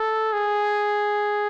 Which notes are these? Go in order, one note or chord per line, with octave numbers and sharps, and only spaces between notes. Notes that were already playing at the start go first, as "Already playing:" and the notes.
Already playing: A4
G#4